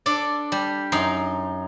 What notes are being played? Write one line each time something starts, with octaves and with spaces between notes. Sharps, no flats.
D4 A4 D5
G3
F#2 D#4 C6